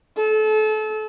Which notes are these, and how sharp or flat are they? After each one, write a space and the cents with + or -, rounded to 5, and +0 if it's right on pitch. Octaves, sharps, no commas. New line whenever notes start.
A4 -30